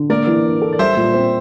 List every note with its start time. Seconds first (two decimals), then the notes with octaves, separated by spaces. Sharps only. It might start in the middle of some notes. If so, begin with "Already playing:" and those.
Already playing: D3
0.09 A#3 A#4 D5
0.27 E3
0.45 D4
0.62 A4
0.73 D5
0.79 G3 C5 E5
0.97 A#2
1.14 C4